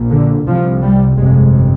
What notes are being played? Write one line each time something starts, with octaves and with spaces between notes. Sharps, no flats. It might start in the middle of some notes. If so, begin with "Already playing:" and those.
Already playing: A#1 A#2
D3
C2 C3 F3
G3
G1 F2 C3 G#3